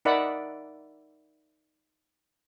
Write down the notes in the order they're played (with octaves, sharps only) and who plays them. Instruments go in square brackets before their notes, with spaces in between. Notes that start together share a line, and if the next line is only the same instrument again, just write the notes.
[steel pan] D#4 A#4 D5 E5 F#5 B5